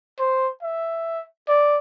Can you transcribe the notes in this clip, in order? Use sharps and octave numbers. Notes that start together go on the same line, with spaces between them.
C5
E5
D5